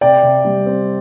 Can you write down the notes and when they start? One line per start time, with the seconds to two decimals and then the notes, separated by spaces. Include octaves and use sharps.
0.01 C3 D5 G5
0.23 C3
0.45 G3
0.66 C4